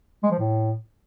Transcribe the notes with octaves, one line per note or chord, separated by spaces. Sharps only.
G#3
F3
A2